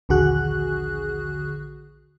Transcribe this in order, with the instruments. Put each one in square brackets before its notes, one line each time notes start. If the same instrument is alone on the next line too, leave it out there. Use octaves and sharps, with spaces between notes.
[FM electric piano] A#1 D#2 D3 F#4 G#4 F#6